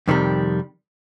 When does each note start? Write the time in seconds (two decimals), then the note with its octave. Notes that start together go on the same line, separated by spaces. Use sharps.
0.08 F2 C3 D#3 G3